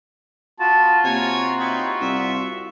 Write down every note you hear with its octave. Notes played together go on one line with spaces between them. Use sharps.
B3 F4 F#4 A5
C3 A#3 C#5 G#5 A#5
D#4 E4 G5 C#6
C2 E5